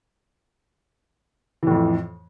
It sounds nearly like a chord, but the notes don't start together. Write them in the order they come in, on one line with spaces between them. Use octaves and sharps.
E3 A2 F2